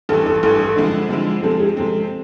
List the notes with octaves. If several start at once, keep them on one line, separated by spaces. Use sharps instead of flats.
A1 G2 E3 A4
A4
A1 G2 E3 A4
A4
D3 F3 G#3 C4 E4
D3 F3 G#3 C4 E4
C3 F3 G#3 C4 A4
G#4
C3 F3 G#3 C4 A4